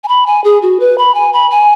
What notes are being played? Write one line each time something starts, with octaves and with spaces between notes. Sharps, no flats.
G#5
B5
G#5
G#4
F#4
B4
B5
G#5
B5
G#5